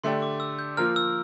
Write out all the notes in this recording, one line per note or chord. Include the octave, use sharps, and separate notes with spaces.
D3 A3 D4 G4 C6
D6
E6
G6
F3 A#3 F4 A#4 F6
E6